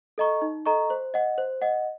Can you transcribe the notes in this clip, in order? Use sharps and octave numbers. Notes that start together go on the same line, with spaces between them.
A4 D#5 A#5 C#6
D#4
A4 D#5 A#5 C#6
C5
D#5 F#5
C5
D#5 F#5